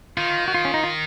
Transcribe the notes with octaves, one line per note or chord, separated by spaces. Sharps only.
D#3 F4
F#4
F4
C#4
D#4
F4